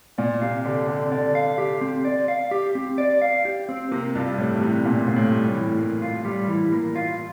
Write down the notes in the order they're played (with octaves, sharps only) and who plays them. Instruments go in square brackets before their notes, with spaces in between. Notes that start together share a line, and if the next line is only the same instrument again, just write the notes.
[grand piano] A#2 [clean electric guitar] D5
[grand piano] C3 [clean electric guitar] F5
[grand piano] D3 [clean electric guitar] G4
[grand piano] D3 [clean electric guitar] C4
[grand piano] D3 [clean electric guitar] D5
[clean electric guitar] F5
G4
C4
D5
F5
G4
C4
D5
F5
G4
C4
[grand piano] C3 [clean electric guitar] A#3
[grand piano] G2 [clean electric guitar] F4
[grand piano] A2 [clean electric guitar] G3
[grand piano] C3 [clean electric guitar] E3
[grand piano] A#2 [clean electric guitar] A#3
[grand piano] A#2 [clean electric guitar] F4
[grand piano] A2
[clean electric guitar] G3
[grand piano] A2
[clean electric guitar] E3
A#3
F4
G3
E3
A#3
F4